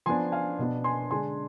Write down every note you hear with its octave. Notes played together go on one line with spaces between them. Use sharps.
F3 B3 D4 G#5 C6
F5 G#5
B2 B3 D4
G#5 C6
D3 G#3 D4 G#5 C6